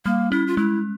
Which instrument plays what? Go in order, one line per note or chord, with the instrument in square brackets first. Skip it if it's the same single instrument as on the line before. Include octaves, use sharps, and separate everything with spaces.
[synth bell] G3 [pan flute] A#3
[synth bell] C#4 [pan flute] E4
[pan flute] F4
[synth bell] G#3 [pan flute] E4